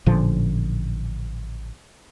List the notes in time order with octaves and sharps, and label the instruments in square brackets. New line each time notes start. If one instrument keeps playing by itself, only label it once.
[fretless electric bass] A1 A#2 D3 F3